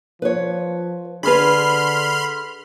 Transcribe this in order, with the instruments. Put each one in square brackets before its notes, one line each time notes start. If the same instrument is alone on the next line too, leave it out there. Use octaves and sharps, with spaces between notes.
[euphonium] F3 [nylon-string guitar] B4 C#5
[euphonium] D3 [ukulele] D4 B4 [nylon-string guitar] G#4 [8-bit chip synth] B5 C6 F6